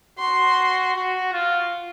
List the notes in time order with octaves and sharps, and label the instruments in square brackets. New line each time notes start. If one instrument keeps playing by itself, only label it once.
[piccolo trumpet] F#4 [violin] C6
[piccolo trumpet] F#4
F4